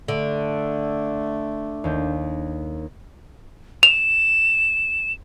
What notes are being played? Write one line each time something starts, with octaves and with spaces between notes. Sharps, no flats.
D3 A3
D#2 D4 G6
E7 F7